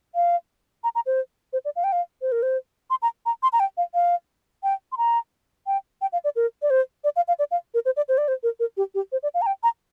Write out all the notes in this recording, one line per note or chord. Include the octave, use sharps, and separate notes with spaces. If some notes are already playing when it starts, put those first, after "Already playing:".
F5
A#5
A#5
C5
C5
D5
F5
G5
F5
C5
A#4
C5
C6
A#5
A#5
C6
A#5
G5
F5
F5
G5
C6
A#5
G5
G5
F5
D5
A#4
D5
C5
D5
F5
F5
D5
F5
A#4
C5
D5
C5
D5
C5
A#4
A#4
G4
G4
C5
D5
F5
A#5
G5
A#5